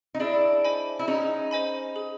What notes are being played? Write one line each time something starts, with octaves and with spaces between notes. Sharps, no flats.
D#4
D4 E4 G#4
C5 D#5 G#5 B5
E4
C#4 D#4 G#4
C5 D#5 G#5 B5
G#4